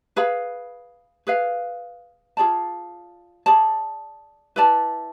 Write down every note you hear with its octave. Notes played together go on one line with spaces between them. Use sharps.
G#4 B4 F5 B5
G#4 B4 F5
F4 G#4 D5 A5
G#4 D5 A5
E4 B4 D5 A5